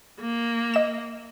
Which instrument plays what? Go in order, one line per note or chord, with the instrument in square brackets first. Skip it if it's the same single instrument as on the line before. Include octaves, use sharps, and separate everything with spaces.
[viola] A#3
[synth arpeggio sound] D#5 E7